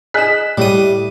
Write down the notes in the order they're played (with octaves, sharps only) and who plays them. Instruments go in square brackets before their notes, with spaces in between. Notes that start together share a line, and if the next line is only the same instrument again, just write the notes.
[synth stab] G#4 E7 [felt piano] D#5 F#6 B6
[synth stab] A2 [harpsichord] G3 D#6